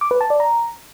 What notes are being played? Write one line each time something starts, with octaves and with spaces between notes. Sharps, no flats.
D6
B4
A5
D5
A#5